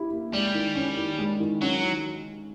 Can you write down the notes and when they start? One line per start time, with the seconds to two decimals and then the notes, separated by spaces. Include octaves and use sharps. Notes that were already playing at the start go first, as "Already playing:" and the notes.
Already playing: E4 G4
0.12 A#3
0.32 G3 G#3
0.55 D#3
0.75 C#4
0.97 D#3
1.19 G#3
1.40 D#3
1.61 F#3 C#4
1.82 D#3